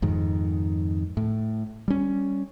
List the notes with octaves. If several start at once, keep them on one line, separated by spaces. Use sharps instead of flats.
F2 G#2 D#3
A2
G3 C#4